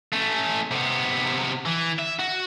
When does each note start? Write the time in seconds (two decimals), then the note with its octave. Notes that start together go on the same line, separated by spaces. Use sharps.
0.13 A3 C#4
0.71 C3 B3
1.66 E3
1.99 E5
2.20 F#4